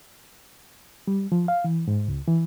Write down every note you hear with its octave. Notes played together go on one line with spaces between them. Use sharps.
G3
F3
F5
E3
G#2
C#2
E3